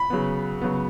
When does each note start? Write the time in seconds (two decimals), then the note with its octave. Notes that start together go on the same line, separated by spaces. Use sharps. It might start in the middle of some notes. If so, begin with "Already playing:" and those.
Already playing: B5
0.10 C#3 F#3 B3
0.61 C#3 F#3 B3